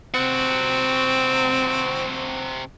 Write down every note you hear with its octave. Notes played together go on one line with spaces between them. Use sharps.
C3 C4 F#4